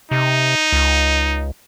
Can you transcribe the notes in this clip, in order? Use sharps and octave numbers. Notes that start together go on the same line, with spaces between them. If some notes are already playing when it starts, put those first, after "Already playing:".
C3 D#4
C#2